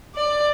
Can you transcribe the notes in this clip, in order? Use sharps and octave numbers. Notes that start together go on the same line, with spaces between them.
D5